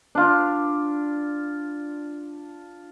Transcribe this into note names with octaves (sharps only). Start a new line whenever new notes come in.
D4 F4